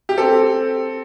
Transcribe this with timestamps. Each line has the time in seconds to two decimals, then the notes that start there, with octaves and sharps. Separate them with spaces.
0.09 G4
0.18 C4 A4